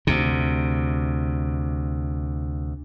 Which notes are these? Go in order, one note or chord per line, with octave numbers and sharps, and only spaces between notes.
D2 C3